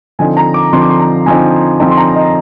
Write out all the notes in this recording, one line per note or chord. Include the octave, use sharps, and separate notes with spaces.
D3 F3 C4 D#4 G#5
A#5
D6
D3 F3 C4 D#4 C6
D6
C6
A#5
D3 F3 C4 D#4 G#5
D3 F3 C4 D#4 A#5
C6
A#5
D#5